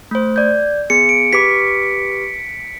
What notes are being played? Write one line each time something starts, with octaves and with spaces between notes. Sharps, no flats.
A3 C5
D5 G6
B3 G#4 C#7
D7
G4 B4 D6 B6